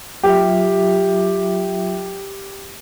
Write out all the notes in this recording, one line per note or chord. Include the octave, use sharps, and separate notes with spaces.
F#3 F4 G4 E5